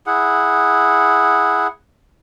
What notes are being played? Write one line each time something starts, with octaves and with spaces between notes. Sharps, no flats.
E4 G#4 F#5